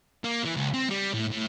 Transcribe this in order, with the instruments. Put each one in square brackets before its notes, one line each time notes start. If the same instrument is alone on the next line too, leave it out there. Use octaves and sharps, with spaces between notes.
[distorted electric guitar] A#3
E3
C#2
C4
G3
A2
A2